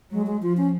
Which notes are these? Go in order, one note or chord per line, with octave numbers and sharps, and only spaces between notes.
F#3 G#3
G#3
F3 F4
C#4